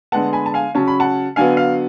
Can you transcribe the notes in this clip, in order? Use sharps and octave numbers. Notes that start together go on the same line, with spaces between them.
D3 G#3 B3 F#5 A5
G#5 B5
A5
F5 G#5
C#3 F#3 C#4 A5
B5
F#5 A5
D3 F#3 B3 F5 G#5
F5